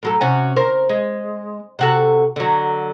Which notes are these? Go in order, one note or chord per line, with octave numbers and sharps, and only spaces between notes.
A2 F#3 A4
C3 C#4 F#4
C#3 A#4 C5
G#3
C3 F#4 A4
D3 F#3